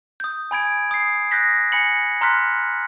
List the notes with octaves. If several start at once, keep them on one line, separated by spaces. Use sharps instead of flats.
D#6 G6
G#5 B5 G#6 D7
D#6 C7
D#6 F#6 G6 A#6 B6
G#5 B5 C#7 F#7
A#5 C6 F6 F#6 B6